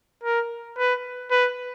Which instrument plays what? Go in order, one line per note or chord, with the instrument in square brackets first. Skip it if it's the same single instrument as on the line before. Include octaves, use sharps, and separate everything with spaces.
[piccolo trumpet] A#4
B4
B4